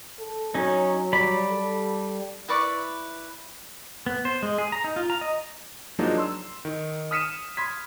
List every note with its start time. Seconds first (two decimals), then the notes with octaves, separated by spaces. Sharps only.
0.20 A4
0.54 F#3 C#4 D#4
1.13 G3 D5 B5
1.50 A4
2.48 E4 B4 D5 C#6
4.07 B3
4.25 C5
4.43 G#3
4.58 G#4
4.72 A#5
4.84 D#4
4.96 F4
5.10 A#5
5.21 D#5
5.99 F3 F#3 G#3 A#3 D4 D#4
6.18 C6 E6
6.65 D#3
7.11 D#6 F6 B6 C#7 D#7 E7
7.57 B5 C6 G#6 B6